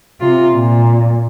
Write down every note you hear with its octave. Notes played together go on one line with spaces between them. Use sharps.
C3 F4
A#2